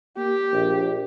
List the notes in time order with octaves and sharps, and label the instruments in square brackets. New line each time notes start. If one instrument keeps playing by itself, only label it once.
[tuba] A#3 [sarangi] G4
[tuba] A#1